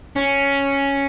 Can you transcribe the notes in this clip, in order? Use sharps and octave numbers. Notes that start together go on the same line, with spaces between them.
C#4